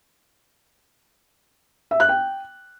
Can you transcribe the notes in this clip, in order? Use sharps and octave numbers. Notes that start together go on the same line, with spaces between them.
E5
F#6
G5